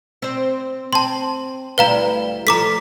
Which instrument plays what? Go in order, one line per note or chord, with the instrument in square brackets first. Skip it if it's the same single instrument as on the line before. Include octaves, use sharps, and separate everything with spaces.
[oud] C4 C5
[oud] C4 [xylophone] A5 C6
[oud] D2 G3 E4 [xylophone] B4 F5 A#5
[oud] F3 A3 [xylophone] A#5 D6 B6